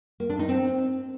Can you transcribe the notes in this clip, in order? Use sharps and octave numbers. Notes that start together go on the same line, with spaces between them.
A#3
D4
D#4
C4